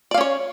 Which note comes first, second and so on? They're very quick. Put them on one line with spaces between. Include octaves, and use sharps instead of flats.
D5 F5 C#4 C#5